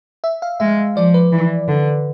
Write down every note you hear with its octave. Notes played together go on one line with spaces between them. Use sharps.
E5
F5
G#3 E5
F3 D5
B4
E3
D3